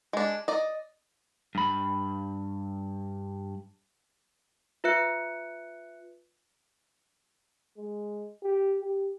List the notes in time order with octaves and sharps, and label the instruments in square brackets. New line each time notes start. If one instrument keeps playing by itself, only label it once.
[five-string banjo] G#3 D4
D5 D#5
[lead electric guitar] G2 B5
[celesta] F4 B4 E5 F#6 C#7
[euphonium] G#3
G4
G4